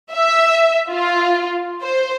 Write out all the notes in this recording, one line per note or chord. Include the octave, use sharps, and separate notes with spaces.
E5
F4
C5